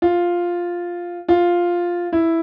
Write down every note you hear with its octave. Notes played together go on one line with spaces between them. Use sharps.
F4
F4
E4